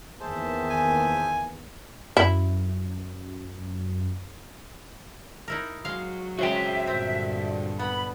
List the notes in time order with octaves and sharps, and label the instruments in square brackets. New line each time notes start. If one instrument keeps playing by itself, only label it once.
[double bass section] E2 D#3 A#3 [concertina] G#4 C5 A5 [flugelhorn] E5
[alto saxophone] G#5
[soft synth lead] F#2 [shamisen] E4
[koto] D#4 E4 A#4
[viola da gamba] F#3 [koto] G#3 F5
[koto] C#3 G#3 [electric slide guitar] F#4 C5 G5 [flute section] E5
[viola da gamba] G2 A#2 D3 [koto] C4
[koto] B3 [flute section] B5